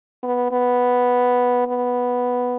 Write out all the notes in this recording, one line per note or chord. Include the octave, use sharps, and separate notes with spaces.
B3
B3
B3